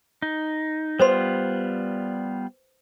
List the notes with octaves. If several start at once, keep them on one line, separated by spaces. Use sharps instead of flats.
D#4
G3 B3 F4 B4 C5 C6